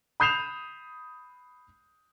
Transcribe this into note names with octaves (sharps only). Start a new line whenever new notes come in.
B5 D#6 G6 C7 E7 F7